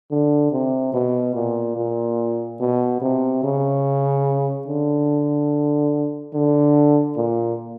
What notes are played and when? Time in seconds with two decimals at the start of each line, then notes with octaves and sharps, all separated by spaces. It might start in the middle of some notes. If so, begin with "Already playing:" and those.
0.11 D3
0.52 C3
0.94 B2
1.35 A#2
1.76 A#2
2.60 B2
3.01 C3
3.43 C#3
4.67 D3
6.34 D3
7.16 A#2